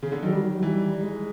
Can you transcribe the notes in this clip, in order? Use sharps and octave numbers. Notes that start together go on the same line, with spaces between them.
C#3
D3
D#3 F#3
G3
F#3
F#3
E3 G3
G3
G#3